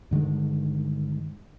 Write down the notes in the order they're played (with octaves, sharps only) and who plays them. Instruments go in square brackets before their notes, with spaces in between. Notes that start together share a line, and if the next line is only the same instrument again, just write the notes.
[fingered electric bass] G2 D3 D#3 G#3